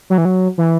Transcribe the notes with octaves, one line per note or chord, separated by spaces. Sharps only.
F#3
E3
F#3
E3